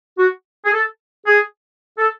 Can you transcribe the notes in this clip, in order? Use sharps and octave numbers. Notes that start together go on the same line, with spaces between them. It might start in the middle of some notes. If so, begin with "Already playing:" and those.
F#4
G#4
A4
G#4
A4